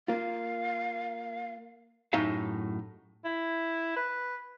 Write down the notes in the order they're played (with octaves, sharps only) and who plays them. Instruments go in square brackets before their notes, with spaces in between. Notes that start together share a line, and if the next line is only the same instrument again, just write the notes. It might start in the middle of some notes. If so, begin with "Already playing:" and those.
[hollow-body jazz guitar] A#3 F4 [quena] F5
[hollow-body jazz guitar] F#2 A2 D#4 G4 E5 F5
[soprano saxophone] E4
B4